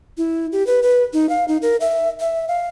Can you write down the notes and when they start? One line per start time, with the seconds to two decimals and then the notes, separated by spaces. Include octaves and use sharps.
0.18 E4
0.52 G4
0.67 B4
0.83 B4
1.13 D#4
1.29 F5
1.48 D#4
1.62 A#4
1.81 E5
2.20 E5
2.48 F5